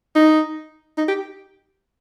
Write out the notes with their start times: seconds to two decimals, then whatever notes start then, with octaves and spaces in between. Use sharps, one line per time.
0.15 D#4
0.98 D#4
1.08 G4